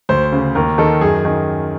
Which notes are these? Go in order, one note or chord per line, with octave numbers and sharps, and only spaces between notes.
D2 C5
C#3
D#2 A#4
D#3 A4
F#2 G#4
D#3